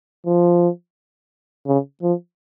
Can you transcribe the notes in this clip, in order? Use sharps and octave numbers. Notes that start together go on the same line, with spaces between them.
F3
C#3
F3